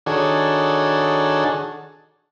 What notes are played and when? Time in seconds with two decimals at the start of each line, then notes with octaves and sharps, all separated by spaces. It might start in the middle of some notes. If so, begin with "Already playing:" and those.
0.06 D#3 D4 F#4 G#4 A4 C#5